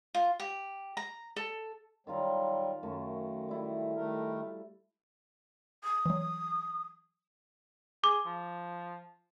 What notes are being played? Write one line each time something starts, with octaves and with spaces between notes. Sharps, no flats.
F4
G4
A#5
A4
D#3 F#3 G3 F4 A#4
F#2 D#3 A3
G3 E4 A4
D#3 A3 A#4
D#6
E3 F#3
G#4 D6
F3